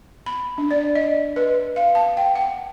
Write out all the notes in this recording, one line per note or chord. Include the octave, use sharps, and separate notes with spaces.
B5
D4
D5
D#5
B4
F5
A5
G5
F#5